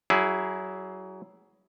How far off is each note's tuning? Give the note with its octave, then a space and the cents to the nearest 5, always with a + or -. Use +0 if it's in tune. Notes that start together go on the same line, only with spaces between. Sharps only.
F#3 +25 E4 +0 G#4 +10